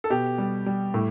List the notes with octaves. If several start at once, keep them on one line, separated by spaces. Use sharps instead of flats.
A4
B2 G4
G3
G3
A2